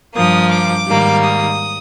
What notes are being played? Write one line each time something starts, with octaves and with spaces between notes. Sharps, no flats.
G2 F3 A#3 D#6
D6
G#2 D#3 G3 A#3
D#6